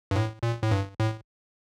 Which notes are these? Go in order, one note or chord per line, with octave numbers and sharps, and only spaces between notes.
G2
A2
A#2
A2
G2
A2